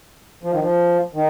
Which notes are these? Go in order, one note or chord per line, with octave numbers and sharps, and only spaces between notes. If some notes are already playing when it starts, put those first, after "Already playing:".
F3
D#3
F3
D#3